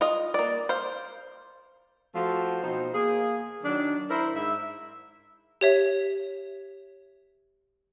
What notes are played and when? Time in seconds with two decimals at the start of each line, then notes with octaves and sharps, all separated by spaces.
0.01 F4 D#5
0.34 A#3 D5
0.69 C5 F5
2.15 F3 A3 F4 F#4 C5
2.63 B2 C4 D#4 C5
2.93 A#3 G#4
3.64 D#3 F#3 D4
4.10 E4 A#4 C5
4.35 G#2 E4 E5
5.61 G4 C#5 E5